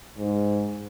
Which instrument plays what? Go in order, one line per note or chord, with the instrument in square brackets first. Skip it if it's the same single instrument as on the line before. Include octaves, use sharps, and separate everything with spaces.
[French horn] G#2